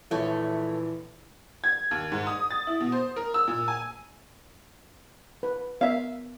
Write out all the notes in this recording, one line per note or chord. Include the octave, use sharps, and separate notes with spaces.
A#1 A#2 E3 F3 A3 C#5
G#6
D#2
G#2
D#6
A6
E4
B2
C5
A#4
E6
A#2
G#5
B4
B3 A#4 E5 F5